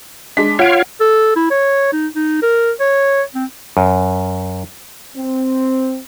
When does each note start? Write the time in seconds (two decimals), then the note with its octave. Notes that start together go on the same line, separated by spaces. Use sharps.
0.37 G#3 D4 B6
0.59 F4 C#5 F5 F#5 D7
1.00 A4
1.36 E4
1.51 C#5
1.92 D#4
2.15 D#4
2.42 A#4
2.80 C#5
3.35 C4
3.77 F#2
5.17 C4